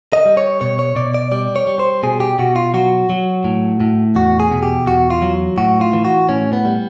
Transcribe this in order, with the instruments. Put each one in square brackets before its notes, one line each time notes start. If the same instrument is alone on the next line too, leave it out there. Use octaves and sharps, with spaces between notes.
[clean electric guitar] D#5
G3
C#5
B2 C#5
C#5
B2 D5
D5
G3 D5
C#5
G3
C5
B2 G#4
G4
B2 F#4
F4
F#3 F#4
F#3
A2
A2
E2 F#4
G#4
B2
G4
E2 F#4
F4
F#3
A2 F#4
F4
E3
F#4
A2 C#4
B3
G3